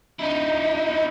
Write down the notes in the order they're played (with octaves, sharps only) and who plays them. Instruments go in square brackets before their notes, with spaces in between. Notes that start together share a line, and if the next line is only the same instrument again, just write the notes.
[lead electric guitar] D#4 E4